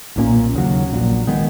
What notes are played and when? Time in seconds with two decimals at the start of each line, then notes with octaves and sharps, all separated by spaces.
0.16 B1 A#2 A#3 C#4
0.53 D#2 C#3 F#3
0.91 A#1 A#2 F#3
1.27 D#3 G#3 B3